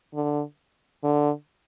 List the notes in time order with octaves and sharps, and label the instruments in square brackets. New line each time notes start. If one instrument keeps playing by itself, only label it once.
[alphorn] D3
D3